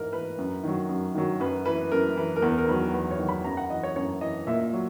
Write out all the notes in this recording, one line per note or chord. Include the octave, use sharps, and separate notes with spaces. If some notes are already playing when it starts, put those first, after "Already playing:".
Already playing: G#2 E3 A#4
E3 B4
F#2
D#3 F#3
F#2
D#3 F#3
F#2 B4
E3 B4
F#2 A#4
E3 B4
A#4
E2 B4
A#4
D#3 F#3 B4
E2 B4
C#5
D#3 F#3
B5
F#2 A#5
F#5
E3 D#5
C#5
F#2 C#5
E3 D#5
A#2 E5
F#3